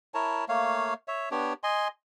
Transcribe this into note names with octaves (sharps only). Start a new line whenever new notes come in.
E4 A#4 C#5 A5
A3 A#3 C#5 F5
C#5 E5
B3 D4 G4 C#5
D#5 G#5 C6